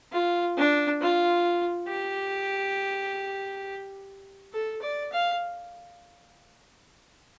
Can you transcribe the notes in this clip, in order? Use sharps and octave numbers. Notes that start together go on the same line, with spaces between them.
F4
D4
F4
G4
A4
D5
F5